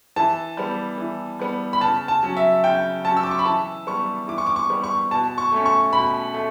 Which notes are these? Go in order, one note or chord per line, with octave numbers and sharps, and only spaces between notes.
E3 A5
G3 B3
E3
G3 B3
B5
C#3 A5
A5
F#3 C#4
E5
C#3 G5
F#3 C#4 A5
E6
D6
C#6
B5
E3 A5
G3 B3 C#6
E3 D6
C#6
D6
C#6
G3 B3
C#6
B2 A5
C#6
A3 C#4
C#6
B2 B5
A3